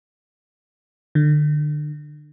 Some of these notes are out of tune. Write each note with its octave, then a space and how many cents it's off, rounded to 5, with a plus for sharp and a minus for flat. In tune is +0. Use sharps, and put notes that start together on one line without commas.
D3 +30